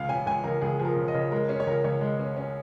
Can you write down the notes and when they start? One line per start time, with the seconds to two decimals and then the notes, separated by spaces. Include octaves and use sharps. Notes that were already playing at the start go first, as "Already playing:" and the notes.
Already playing: C#2 F5
0.09 C#3 G#5
0.26 C#2 G#5
0.44 C#2 A#4
0.61 C#2 G#4
0.79 F3 G#4
0.85 A#4
0.96 C#3
1.08 D#5
1.14 C#3
1.31 G#3 A#4
1.49 C#4 G#4
1.60 C#5
1.67 C#2 A#4
1.84 C#2 C#5
2.01 G#3
2.19 C#4
2.37 C#4